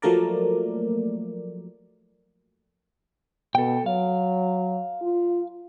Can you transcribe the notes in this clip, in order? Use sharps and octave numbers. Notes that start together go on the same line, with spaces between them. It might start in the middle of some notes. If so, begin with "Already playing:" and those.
F3 F#3 A3 A#3 A#4 D5
B2 A4 G5
F#3 F5
F4